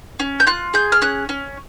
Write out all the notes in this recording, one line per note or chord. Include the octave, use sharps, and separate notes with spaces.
C#4
G6
F4 F#6
G#4 G6
F6
C#4 F#6
C#4